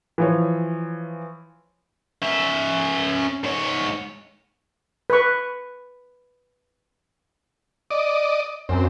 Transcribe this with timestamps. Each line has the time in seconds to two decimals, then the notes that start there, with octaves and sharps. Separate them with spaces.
0.18 E3 F3 C#5
2.22 C#4 E5
3.44 G#2 C#5
5.10 B4 C#6
7.91 D5 D#5
8.69 F#2 C4